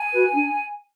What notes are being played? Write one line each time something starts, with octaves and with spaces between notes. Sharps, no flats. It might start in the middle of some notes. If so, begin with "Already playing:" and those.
Already playing: G#5
F#4 B4
D4